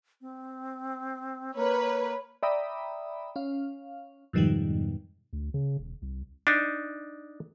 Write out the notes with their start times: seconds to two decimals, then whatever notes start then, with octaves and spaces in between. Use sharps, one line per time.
0.21 C4
1.55 A#3 B4 C#5
2.43 D5 E5 G5 A#5 B5 D#6
3.36 C#4 F5
4.33 F2 G#2 B2 D#3 F3 G3
5.33 D2
5.54 C#3
5.79 E1
6.02 C2
6.47 D4 D#4